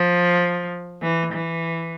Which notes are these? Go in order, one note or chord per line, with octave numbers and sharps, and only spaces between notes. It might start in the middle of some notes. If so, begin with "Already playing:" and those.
Already playing: F3
E3
E3